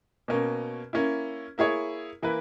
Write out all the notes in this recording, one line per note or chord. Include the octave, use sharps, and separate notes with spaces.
B2 A#3 C#4
A#3 C#4 E4
A#3 E4 G#4 C#5
E3 A#3 E4 B4